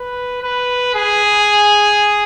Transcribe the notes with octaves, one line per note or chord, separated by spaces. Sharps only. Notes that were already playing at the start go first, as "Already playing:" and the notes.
Already playing: B4
B4
G#4